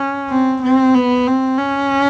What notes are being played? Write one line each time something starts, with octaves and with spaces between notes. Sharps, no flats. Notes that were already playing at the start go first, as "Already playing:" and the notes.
Already playing: C#4
C4
C4
B3
C4
C#4